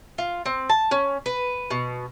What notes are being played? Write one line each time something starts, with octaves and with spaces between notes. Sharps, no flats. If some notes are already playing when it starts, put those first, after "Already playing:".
F4
C4
A5
C#4
B4
B2